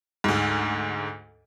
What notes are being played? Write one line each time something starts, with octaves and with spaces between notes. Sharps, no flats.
D2 G#2